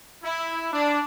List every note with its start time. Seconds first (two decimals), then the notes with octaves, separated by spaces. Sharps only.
0.23 E4
0.72 D4